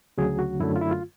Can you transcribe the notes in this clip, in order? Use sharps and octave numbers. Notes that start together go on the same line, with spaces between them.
D2 C#3 F#3 G#4
F#4
F#2 D3 F#3 A3 E4
F4
E4
F4